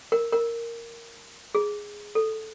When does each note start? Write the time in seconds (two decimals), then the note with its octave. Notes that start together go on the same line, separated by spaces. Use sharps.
0.12 A#4
0.33 A#4
1.55 G#4
2.15 A4